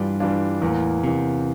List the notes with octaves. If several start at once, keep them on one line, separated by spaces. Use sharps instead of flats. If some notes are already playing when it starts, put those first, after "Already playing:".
Already playing: G2 E3 G3 D4 F4
E3 G3 D4 F4
E2 A2 E3 A#3
E2 C3 E3 A#3